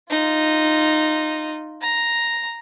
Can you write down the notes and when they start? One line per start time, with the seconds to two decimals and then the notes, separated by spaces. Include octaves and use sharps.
0.11 D#4 F4
1.82 A#5